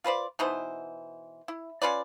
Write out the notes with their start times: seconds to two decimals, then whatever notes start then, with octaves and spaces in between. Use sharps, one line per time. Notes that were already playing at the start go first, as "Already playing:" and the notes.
0.04 F4 B4 C5 D5
0.39 B2 E3 D#4 C5
1.48 E4
1.82 C#4 F4 B4 D5